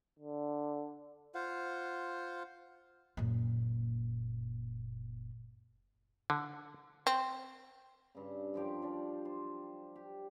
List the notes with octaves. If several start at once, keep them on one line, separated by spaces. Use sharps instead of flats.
D3
F4 C5 F5 F#5
F#1 A#2
D3
C4
G2 C#3
F#2 F3 G4 D6
D4 D5 F5
C5
G4